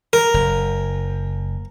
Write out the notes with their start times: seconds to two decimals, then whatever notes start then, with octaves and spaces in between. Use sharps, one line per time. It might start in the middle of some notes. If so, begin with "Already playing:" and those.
0.13 A#4
0.34 F#1